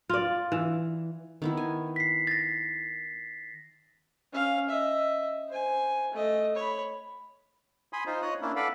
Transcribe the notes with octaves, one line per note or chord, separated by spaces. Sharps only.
F4 D5
E3
D#3 B3 E4
G#5
B6 C7
A6 A#6
C#4 F5
D#5 E5
C5 G#5
A3 D#5
C#5 B5
G#5 B5 C6 D#6
D#4 F4 C5
C#5 D#5 D#6 F#6
A#3 C#4 D4 E4
A4 B4 D5 F5 F#5 B5